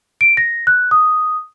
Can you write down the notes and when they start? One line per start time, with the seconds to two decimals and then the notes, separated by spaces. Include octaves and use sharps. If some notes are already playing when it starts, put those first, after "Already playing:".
0.21 D7
0.37 A#6
0.67 F#6
0.91 D#6